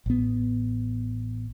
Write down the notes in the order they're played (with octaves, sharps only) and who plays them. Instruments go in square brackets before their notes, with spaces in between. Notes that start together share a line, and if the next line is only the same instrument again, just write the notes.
[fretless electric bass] A1 B3